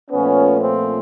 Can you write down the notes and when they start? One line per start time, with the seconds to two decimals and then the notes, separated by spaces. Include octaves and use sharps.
0.11 A#2 F3 A3 B3 C#4
0.61 C4